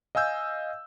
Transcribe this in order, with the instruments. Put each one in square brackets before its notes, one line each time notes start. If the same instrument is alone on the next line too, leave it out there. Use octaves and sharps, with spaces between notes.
[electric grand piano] D#5 F5 G#5 E6 G6